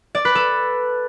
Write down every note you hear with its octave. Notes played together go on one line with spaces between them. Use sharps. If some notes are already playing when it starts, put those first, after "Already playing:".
D5
B4
A4